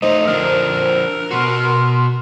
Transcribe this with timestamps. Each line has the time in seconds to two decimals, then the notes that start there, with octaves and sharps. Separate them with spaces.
0.02 A3 D#4 C5 D#5
0.27 D3 F3 D4 A#4
1.31 B2 F#4 C6